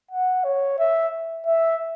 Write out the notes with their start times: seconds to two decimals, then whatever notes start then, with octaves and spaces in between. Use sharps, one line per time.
0.11 F#5
0.44 C#5
0.79 E5
1.47 E5